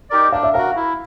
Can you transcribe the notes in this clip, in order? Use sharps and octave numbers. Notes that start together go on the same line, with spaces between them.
D#4 G4 A#4 D5
D4 F5
E5
F#4 A#4 F5
E4